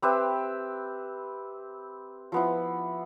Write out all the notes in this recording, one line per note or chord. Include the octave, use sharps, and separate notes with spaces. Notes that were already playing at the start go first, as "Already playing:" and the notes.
C4 G4 B4 E5
F3 B3 E4